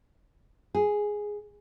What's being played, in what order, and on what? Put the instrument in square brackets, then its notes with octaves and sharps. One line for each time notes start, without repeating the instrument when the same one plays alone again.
[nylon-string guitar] G#4